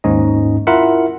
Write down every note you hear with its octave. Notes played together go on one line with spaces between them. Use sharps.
D#2 G#2 C#4 D#4 D#5
E4 F4 A#4 E5 F#5